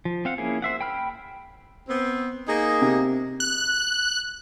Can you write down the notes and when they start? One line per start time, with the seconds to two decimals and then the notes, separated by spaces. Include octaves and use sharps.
0.05 F3
0.25 C4 F5 F#5
0.38 A#3 C#4 E4 G#4
0.62 C5 E5 F#5
0.81 G5 B5 F6
1.88 B3 C4
2.47 A#3 D#4 G#4
2.82 C3
3.40 F#6